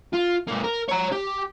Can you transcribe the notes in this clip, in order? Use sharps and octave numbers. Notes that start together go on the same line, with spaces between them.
F4
G#2 A#3
A#4
C#5 A#5
G4